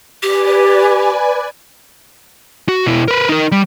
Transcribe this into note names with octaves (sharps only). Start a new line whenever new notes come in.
G4 B4 D5 G#5
F#4
B2 E4
A#4 B4
D#4 A#4
G3